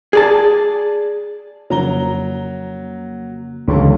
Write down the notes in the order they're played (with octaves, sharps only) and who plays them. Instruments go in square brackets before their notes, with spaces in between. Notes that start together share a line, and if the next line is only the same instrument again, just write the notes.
[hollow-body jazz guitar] G#4 D5 A5
[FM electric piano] F2 C#3 A#3 [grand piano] F#3 A#5 G7
[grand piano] E1 C#4 A4 [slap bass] C#2 [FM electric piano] D3 E3 G3